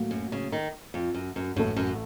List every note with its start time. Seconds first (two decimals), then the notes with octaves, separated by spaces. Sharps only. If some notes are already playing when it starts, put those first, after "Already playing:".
Already playing: A2 F#3 A#3
0.11 F#2
0.32 C#3
0.52 D#3
0.94 F2
1.14 F#2
1.36 F#2
1.56 A1 F#2 A2 A3
1.76 F#2